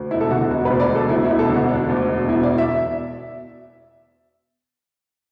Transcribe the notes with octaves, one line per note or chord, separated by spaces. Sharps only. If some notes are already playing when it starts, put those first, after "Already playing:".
Already playing: D2
E1 E4
A4
D3 F#4
E1 F#4
B4
D2
D5
E1
A4
D2 E4
E4
E1
A4
D3 F#4
E1 D4
D2
E1
B2 E4
D5
B2
E5